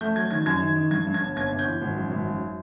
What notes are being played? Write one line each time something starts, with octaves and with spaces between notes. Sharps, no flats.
A3 G6
F#3 G#6
D#3 G#6
F#2 G#6
D#3
D#3
G2 G#6
G2
G#6
G1
G1 G#6
G1
G6
E3
G#1
F#2
G#1
F#2